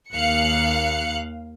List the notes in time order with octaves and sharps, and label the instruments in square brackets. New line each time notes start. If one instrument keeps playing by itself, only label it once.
[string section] D#2 F5 F#6 C#7